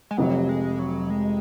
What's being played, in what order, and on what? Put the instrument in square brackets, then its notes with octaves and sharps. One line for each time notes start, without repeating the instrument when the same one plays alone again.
[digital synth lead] G#3
[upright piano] F1 F2 C3 [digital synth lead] F#3
[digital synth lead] G#3
F#3
G#3